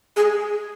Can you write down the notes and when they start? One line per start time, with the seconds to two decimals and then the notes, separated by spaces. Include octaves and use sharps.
0.16 G#4